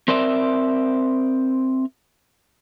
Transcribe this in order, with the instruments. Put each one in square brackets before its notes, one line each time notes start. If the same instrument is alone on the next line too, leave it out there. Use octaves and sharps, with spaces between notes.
[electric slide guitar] C4 A#4 C5 D5 E5